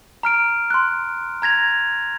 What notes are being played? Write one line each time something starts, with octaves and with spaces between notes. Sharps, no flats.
A#5 F6 D7
C6 F#6
A#5 G#6 A#6 F7